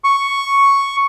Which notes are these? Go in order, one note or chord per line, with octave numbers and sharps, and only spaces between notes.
C#6